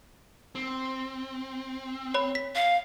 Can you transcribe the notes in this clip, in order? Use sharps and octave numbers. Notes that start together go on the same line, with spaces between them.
C4
C#5 B5
B6
F5